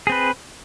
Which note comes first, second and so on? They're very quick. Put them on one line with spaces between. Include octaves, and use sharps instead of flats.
G#4 C4 B4